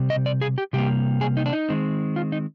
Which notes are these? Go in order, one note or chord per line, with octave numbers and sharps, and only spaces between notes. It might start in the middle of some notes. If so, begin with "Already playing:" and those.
Already playing: C3 G3 C4
D#5
D5
G#4
G4
C3 G3 A#3 G4
G#4
D#4
D4
D#4
D#3 G#3 C4
F4
D#4